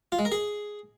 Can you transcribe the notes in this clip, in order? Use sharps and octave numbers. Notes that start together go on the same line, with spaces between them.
F4
G#3
A#4
G#4